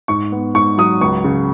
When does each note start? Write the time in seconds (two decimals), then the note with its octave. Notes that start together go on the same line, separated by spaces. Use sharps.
0.08 G#2 C#6
0.32 B3
0.54 G#2 C#6
0.78 F#3 D#6
1.01 C#2 C#6
1.24 C#3